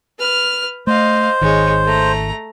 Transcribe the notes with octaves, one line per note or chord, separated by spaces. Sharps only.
B4 F6
A3 C5 D#5 F5
G#1 D#3 G#3 C#5
A3 A#5